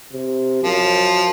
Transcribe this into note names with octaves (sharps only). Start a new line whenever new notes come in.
C3
F#2 F3